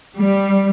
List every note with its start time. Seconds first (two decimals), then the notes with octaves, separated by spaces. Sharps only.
0.17 G3